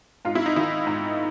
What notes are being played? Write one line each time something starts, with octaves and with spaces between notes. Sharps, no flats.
G#2 F4
E4
D#4
D#3 E4
G#2